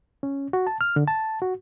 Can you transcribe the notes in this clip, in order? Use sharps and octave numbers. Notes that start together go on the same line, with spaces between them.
C#4
F#4
A5
F6
D3
A5
F#4